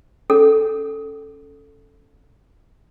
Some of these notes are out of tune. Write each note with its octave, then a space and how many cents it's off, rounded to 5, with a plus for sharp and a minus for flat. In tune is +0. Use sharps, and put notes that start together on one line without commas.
C#4 +10 A4 +0